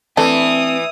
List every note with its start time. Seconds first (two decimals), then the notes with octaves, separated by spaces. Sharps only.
0.17 E3 A3 C4 D4 D#6